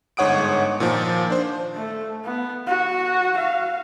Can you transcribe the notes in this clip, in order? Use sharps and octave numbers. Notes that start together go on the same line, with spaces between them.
G1 G#2 C#5 F#5 D#6 D7
A#2 D#3 F3
D4 C5
A3
B3
F#4
F5